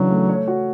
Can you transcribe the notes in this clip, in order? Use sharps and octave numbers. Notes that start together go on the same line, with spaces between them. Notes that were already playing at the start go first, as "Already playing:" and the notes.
Already playing: C#3 E3 F#3 D4
A3
C#5
F#4